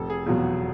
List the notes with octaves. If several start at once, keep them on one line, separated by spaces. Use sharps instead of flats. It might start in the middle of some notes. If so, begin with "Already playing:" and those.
Already playing: F1 A4
G#4
E2 B2 F#3 F4